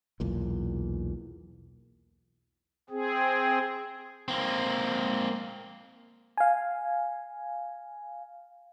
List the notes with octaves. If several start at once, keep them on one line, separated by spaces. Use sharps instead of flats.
B1 E2 A#2
C4 G#4
A#3 C4
F5 G#5